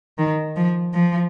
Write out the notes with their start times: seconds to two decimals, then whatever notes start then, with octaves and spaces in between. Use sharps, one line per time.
0.18 D#3
0.56 F3
0.94 F3